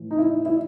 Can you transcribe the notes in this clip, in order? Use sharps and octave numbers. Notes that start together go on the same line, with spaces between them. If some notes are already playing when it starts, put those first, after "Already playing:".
Already playing: A2 E3
D#4
E4
E4